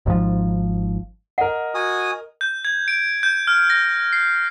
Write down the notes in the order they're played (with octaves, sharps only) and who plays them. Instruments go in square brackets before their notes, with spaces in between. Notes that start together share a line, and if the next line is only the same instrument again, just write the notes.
[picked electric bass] G#1 G#2 B2 F3
[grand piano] A#4 D#5 [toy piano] F#5
[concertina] F#4 G#5 D#6
[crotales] G6
G#6
D7
G6
F6
A#6
C7